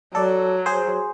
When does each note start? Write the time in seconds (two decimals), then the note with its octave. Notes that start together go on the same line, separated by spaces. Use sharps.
0.15 F#3 A4 D5
0.66 G#4 C5